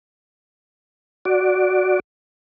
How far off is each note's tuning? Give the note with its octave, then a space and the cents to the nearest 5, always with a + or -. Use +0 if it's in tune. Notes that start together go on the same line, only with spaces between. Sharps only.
F#4 +0 D5 +0